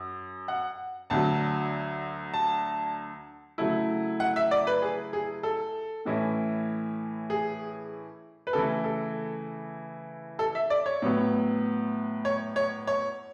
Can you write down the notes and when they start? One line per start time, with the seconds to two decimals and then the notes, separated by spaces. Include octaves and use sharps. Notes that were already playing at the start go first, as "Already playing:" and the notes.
Already playing: F#2
0.48 F#5
1.10 D2 D3 F#3 A5
2.34 A5
3.58 C#3 F#3 A3 E4
4.20 F#5
4.36 E5
4.51 D5
4.67 B4
4.82 G#4
5.13 G#4
5.43 A4
6.05 A2 E3 A3 C#4 E4
7.30 G#4
8.47 B4
8.53 C#3 E3 A3 E4 A4
8.84 A4
10.39 A4
10.55 E5
10.70 D5
10.86 C#5
11.02 A2 F#3 B3
12.25 C#5
12.56 C#5
12.87 C#5